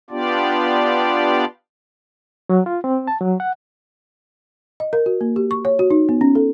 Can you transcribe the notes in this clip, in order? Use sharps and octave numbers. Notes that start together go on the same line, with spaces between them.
B3 D4 F4 G4 D5
F#3
F4
C4
A5
F#3
F#5
D#5
A#4
F#4
A#3
G4
C#6
C#5
F#4
D#4
B3
C#4
A4